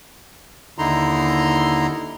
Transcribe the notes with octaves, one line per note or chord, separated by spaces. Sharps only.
D#2 D3 D#4 E4 A#5 C6